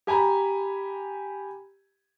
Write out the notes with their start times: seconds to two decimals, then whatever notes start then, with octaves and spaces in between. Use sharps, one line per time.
0.07 G4 G#5 A#5 B5